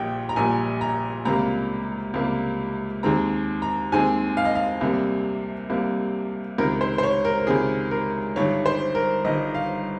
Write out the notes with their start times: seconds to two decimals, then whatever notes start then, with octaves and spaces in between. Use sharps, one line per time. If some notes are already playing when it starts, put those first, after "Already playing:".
Already playing: A#1 A#2 G3 G5
0.29 A#5
0.36 A#1 A#2 G3 G#5
0.81 A#5
1.25 C#2 C3 G3 A#3 A#5
2.14 C#2 C3 G3 A#3
3.03 D#2 D#3 G#3 C4 A#5
3.62 A#5
3.92 D#2 D#3 G#3 C4 G#5
4.37 F5
4.45 D#5
4.55 F5
4.81 C2 C3 G3 A#3
5.70 C2 C3 G3 A#3
6.58 C#2 C3 D#3 A#4
6.81 C5
6.98 C5
7.03 C#5
7.25 A#4
7.39 A#4
7.47 C#2 C3 D#3 G#4
7.91 A#4
8.36 G1 G2 D#3 C#5
8.66 C5
8.95 A#4
9.24 G1 G2 D#3 D#5
9.55 F5